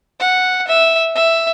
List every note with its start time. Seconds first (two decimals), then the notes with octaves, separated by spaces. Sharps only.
0.20 F#5
0.68 E5
1.15 E5